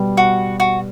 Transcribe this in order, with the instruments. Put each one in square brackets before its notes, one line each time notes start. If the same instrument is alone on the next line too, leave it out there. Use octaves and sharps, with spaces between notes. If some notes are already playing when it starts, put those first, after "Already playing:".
Already playing: [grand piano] B2 G3 B3
[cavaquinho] F#4
F#4